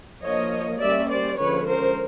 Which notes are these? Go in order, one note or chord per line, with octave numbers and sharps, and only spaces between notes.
F3 A#3 D4 C#5 D#5
G3 A#3 C#4 D5 E5
C5 D5
D3 F3 G#3 C#4 B4 C#5
A#4 C5